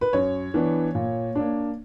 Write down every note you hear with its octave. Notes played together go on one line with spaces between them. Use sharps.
B4
F#2 C#5
E3 B3 D4
A#2
A#3 D4